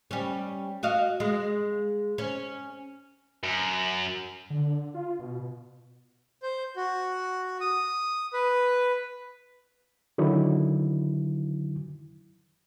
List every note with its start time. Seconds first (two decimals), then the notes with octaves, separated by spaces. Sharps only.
0.11 G3 C#4
0.83 F#4 D#5 F5
1.20 G#3
2.18 C#4
3.44 F#2
4.50 D3
4.94 F4
5.19 B2
6.43 C5
6.76 F#4
7.61 D#6
8.33 B4
10.18 D3 D#3 F#3 E4